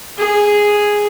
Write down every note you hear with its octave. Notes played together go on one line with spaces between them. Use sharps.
G#4